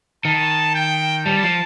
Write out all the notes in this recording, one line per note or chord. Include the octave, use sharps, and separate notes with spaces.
D#3 A5
G5
G3 A5
F3